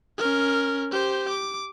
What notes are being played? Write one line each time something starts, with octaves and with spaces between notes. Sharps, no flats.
C#4 A#4
G4 C5
D6